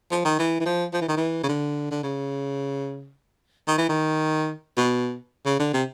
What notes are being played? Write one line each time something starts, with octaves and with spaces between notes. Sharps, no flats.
F3
D#3
E3
E3
F3
F3
E3
D#3
E3
C#3
D3
D3
C#3
D#3
E3
D#3
B2
C#3
D3
C3